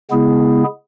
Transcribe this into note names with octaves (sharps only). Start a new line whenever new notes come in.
C#3 G#3 B3 E4 G#4